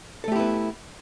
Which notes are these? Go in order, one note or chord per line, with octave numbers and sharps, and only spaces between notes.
A3 B3 E4 G4 A4